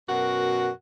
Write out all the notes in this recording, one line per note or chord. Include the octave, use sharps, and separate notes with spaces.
F#2 B2 F#4 A#4 F#5